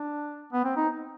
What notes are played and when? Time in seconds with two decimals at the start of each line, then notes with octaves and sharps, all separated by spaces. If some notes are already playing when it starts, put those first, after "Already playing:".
Already playing: D4
0.52 B3
0.64 C4
0.77 D#4